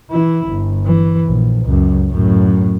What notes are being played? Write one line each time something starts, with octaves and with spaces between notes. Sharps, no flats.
E3 E4
G1
E3
A#1
C#2 F#2
F#2 A2